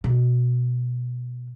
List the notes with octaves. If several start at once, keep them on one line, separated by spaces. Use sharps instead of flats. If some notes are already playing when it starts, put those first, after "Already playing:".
B2